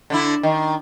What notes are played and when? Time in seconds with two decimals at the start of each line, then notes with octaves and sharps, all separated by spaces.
0.10 D3 D4 E4
0.43 D#3